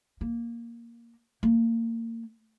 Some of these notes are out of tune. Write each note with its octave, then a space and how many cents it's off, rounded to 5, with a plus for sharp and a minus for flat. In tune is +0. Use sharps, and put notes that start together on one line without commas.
A#3 +5
A#3 -30